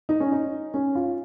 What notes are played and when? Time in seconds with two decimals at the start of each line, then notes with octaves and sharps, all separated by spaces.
0.09 D#4
0.20 C#4
0.32 D#4
0.74 C#4
0.95 F4